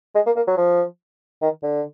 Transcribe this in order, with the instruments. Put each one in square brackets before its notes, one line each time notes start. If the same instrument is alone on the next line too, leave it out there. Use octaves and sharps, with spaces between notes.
[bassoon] G#3
A#3
A#3
F#3
F3
D#3
D3